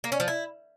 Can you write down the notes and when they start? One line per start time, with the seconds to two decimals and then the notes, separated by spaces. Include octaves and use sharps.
0.04 A#3
0.12 C#4
0.20 F3
0.28 E4